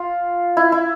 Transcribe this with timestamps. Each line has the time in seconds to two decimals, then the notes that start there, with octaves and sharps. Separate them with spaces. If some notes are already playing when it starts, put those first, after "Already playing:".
Already playing: F4
0.57 E4
0.72 E4